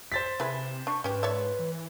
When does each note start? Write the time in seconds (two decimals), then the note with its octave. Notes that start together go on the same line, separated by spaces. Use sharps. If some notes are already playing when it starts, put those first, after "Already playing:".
0.12 C5 A6 B6
0.40 C3 E4 G#4 B4
0.87 D4 C#6
1.04 G#2 C#4 G4 B4
1.23 C#5 D5 E5
1.59 E3